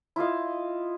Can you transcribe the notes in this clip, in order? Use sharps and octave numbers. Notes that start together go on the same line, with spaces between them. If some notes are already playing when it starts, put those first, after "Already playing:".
E4 F4 D#5 F5